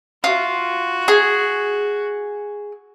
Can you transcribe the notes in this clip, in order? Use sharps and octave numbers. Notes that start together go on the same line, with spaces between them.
F4 F#4
G#4